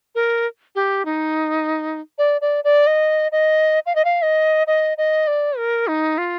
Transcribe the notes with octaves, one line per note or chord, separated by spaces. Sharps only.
A#4
G4
D#4
D5
D5
D5
D#5
D#5
F5
D#5
F5
D#5
D#5
D#5
D5
A#4
D#4
F4